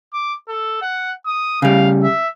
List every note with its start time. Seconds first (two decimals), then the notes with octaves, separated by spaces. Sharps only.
0.13 D6
0.49 A4
0.82 F#5
1.26 D#6
1.62 C#3 G3 F5
2.03 E5